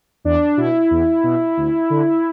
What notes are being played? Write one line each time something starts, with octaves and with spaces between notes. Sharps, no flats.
E2 D4
B2 E4
E2
B2
D2
D3